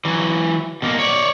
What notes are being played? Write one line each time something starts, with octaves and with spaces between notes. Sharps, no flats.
E3 F#3
B2 A#3
C#5 D5